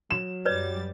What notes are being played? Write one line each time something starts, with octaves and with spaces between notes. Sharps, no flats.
F#3 E7
F#2 G3 B4 C#5 D5 A6